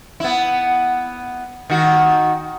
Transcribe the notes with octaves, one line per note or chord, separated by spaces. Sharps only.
B3 E4
D#3 F#4